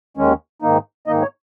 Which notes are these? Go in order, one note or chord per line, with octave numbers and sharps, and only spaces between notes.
D#2 D#3 G#3 C#4
G#2 D#3 A#3 D#4
G#2 D#3 A#3 D#4 D#5
C#5